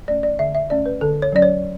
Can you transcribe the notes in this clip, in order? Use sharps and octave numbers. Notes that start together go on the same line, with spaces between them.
A3 C#4 D5
D5
D3 E5
E5
A3 C#4 D5
B4
D3 A4
C#5
F#3 C#4 D5
C#5